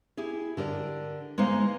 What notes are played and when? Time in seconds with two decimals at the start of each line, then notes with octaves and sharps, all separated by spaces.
0.17 E4 G4 G#4
0.57 D3 G4 A#4 D5
1.38 G#3 A#3 B3 D#4 C5 F5